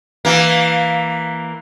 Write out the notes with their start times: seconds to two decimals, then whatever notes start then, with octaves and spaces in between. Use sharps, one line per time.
0.25 E3 A#3